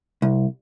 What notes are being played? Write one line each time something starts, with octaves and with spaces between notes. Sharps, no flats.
C2